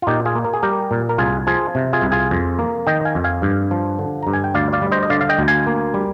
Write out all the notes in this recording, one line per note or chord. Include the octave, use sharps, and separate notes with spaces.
F4
A#2 D#4 G4
F4 G#4
A#3
A#4
G#4
G3 G4 A#4
A#2
A#4
C2 F4 G#4
F3 F4 G#4
C3
F4 G#4
C2
F4 G#4
F2
A#3
D#3 D#5 G5
F5 G#5
F2
F5 G#5
G2
F3
D3
G2 A#5
G#5
G5
D2 D5 F5
D5 F5
G3
C5 D#5
D#5
D3 D5 F5
F5
D#5 G5
D2
F5 G#5
A#3
G3